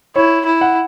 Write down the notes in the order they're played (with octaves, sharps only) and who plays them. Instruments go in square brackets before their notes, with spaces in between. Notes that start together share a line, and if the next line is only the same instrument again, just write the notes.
[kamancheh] E4 [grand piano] C#5
[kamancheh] E4
[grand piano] F#5